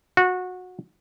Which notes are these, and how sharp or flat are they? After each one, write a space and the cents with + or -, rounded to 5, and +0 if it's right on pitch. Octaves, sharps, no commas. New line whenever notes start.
F#4 -20